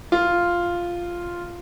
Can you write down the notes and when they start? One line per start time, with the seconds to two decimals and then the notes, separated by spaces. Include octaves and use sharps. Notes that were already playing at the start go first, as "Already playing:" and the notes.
0.12 F4